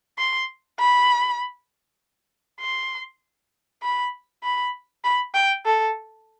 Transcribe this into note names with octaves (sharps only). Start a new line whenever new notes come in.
C6
B5
C6
B5
B5
B5
G5
A4